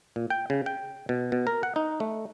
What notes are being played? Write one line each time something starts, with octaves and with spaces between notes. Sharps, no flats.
A#2
G5
C#3
G5
B2
B2
A#4
F#5
D#4
A3